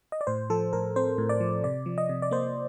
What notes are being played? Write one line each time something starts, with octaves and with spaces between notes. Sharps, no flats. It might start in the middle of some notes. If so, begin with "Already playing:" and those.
D#5
D5
A2 C5
F3 A4
A2 A#4
C4 C5
A2
D5
F3
C3 D5
F3
D#5
C3
D5
A#3 C5